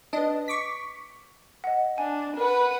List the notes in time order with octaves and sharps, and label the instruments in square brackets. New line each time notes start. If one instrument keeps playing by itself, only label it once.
[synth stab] D4 D#5 [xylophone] B4 A5
[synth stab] C#6 D6 B6
[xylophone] D#5 F#5
[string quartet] D4 [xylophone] G#5
[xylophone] A#4 [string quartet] B4 F#5